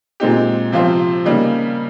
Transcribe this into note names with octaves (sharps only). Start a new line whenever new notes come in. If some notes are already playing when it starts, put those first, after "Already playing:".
A#2 G#3 C4 D#4 G4
C3 F3 C4 F4 C5
C#3 G3 A#3 D#4